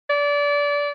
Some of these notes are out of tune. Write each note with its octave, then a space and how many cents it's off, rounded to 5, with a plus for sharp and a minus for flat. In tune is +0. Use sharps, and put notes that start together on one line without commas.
D5 -25